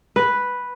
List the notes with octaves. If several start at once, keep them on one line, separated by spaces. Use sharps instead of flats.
B4